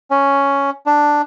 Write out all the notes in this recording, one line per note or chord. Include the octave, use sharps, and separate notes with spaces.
C#4
D4